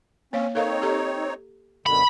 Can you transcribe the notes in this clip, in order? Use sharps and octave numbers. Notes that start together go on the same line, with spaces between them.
A#3 C4 C#4 C#5 F5
C4 D#4 A4 A#4 C#5 F5
G4 A4 A#5
F#2 B2 D3 B5